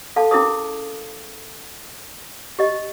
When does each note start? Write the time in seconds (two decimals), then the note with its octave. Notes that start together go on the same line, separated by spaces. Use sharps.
0.16 A4 F5 A5
0.31 C#4 E4 G#4 A#4 D#6
2.59 G4 D#5